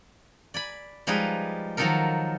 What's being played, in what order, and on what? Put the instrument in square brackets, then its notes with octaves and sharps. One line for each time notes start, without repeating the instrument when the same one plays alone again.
[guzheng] D5 G#5 B5
F3 G3 G#3 D#4 G#4 B4
D#3 F3 F#3 D#4 A4 A#4